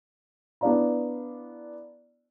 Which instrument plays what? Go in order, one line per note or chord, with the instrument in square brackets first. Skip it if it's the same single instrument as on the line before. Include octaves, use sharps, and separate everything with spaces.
[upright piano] B3 D4 E4 D5 F5 A#5